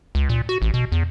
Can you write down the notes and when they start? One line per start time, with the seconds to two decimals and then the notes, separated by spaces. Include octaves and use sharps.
0.15 C#2
0.29 A#2
0.49 F#4
0.62 A1
0.74 B2
0.92 E2